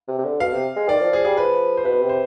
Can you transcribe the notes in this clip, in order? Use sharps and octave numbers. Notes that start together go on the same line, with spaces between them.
C3
C3
D3
B2 F5
C3
G#3
D#3 D5
F3
F3 G#4
G3 G#4
F3 B4
C5
B2 B4
C3
C5